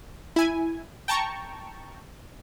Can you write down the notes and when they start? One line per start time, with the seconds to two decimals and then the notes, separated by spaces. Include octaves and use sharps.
0.36 E4 G#5
1.08 G5 A5 A#5 C#6